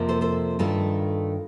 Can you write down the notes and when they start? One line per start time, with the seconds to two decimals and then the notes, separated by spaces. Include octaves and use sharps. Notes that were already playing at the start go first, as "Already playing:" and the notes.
Already playing: F2 C3 F3 A#3
0.09 A4 C5
0.21 A4 C5
0.59 G2 D#3 A3 F4 A4